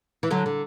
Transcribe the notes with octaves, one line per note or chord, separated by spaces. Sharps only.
E3
D3 F#3
D3